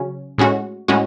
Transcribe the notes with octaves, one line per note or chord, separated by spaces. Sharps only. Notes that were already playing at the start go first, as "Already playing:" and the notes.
Already playing: C#3 F#3 C#4
A2 G#3 C#4 F#4
A2 G#3 C#4 F#4